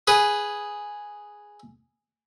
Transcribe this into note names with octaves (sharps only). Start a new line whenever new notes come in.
G#4 B4